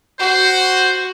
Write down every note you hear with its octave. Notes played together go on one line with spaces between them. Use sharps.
F#4 C5